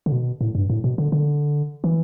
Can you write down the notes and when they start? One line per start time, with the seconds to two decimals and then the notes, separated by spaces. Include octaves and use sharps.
0.06 D3
0.12 B2
0.41 A2
0.55 G2
0.70 A2
0.84 B2
0.98 D3
1.12 D3
1.84 E3